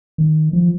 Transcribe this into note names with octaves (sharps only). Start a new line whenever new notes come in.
D#3
F3